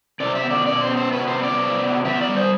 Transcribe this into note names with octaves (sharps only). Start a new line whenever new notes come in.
C3 D5
E5
B3
D5
B2 D5
C5
B3
C5
C3 B4
C5
B3
D5
C3
B3
B3 E5
D5
G3
C5